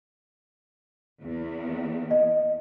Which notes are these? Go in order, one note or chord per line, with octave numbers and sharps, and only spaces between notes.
E2
D#5